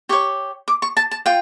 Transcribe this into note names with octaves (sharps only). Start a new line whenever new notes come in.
G4 C#5 C#6
D6
C#6
A5
A5
F4 G5